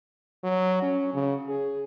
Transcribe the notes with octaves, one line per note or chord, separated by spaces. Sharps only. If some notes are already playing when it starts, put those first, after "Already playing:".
F#3
C#4
C#3
G#4